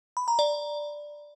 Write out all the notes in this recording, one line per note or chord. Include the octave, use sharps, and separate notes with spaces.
B5
A#5
D5